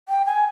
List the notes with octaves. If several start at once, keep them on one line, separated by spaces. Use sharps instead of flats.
G5
G#5